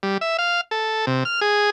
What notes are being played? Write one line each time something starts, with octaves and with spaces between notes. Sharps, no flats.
G3
E5
F5
A4
C3
F6
G#4